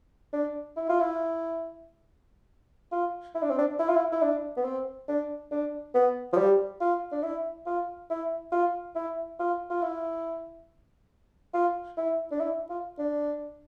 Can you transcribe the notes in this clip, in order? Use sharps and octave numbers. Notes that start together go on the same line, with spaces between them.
D4
E4
F4
E4
F4
E4
D4
C4
D4
E4
F4
E4
E4
D4
B3
C4
D4
D4
B3
F3
G3
F4
D4
E4
F4
E4
F4
E4
F4
F4
E4
F4
E4
D4
E4
F4
D4